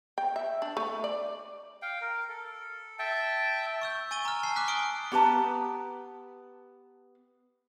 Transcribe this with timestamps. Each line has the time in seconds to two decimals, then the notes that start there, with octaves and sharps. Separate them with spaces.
0.18 G5
0.36 E5
0.62 D4
0.77 A3
1.04 D5
1.82 F5 G5
2.01 A#4
2.28 A4
2.99 E5 G5 A5
3.82 C#6 E6 G6
4.11 G#5 C#6 A6 D#7 G7
4.25 A#5 F6
4.43 G#5 A5 C7
4.56 D6 F6 F#6 B6
4.68 G#5 D6 D#6 F6 D7 G7
5.12 B3 G4 B4 A5 A#5